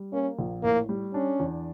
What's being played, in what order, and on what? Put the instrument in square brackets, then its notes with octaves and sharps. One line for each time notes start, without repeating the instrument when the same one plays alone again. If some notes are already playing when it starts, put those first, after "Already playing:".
Already playing: [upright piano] G3
[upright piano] A#3 [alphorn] C#4
[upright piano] A#1
[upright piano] A2 [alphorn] A#3
[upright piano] G3
[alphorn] C#4 [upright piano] D4
[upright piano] E2